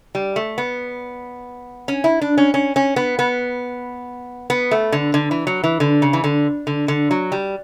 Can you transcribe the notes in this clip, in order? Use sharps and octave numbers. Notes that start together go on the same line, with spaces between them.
G3
A3
B3
C#4
E4
D4
C#4
C#4
C#4
B3
B3
B3
A3
D3
D3
E3
F#3
E3
D3
C#3
E3
D3
D3
D3
F#3
G3